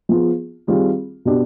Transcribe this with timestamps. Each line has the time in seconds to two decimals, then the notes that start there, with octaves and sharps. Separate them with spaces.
0.09 F3 B3 F4 G#4
0.67 D#3 G3 C4 F4 G#4
1.25 B2 B3 D4 G4